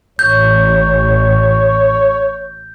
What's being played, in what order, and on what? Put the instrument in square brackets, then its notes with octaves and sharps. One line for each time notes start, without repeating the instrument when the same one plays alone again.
[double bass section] A1 [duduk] C#5 [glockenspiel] G6